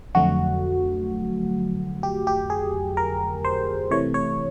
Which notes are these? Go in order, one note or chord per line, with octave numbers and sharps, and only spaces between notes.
F2 D3 F#3 A3 F#4
G4
G4
G#4
A#4
C5
C3 E3 A3 C#5
C#5